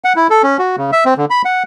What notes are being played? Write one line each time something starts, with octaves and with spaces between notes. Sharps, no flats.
F#5
E4
A4
C#4
F#4
C#3
E5
C4
D3
B5
F#5